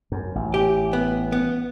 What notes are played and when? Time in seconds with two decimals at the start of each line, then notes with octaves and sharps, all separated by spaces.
0.12 F#2
0.35 A1
0.54 G4
0.93 B3
1.32 B3